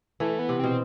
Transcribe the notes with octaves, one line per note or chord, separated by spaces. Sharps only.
E3 A3
B3
C3
B2 C4